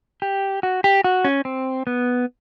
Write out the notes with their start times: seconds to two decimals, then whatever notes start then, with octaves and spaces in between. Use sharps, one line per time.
0.22 G4
0.63 F#4
0.84 G4
1.04 F#4
1.25 C#4
1.45 C4
1.87 B3